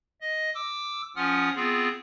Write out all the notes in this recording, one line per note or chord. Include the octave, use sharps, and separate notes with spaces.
D#5
D6 E6
F3 C#4 F4 F#5 D#6 F6
B3 C4 F4 G#4